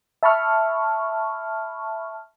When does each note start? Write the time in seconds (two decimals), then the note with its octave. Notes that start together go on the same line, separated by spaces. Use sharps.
0.23 E5 A5 B5 C#6 F6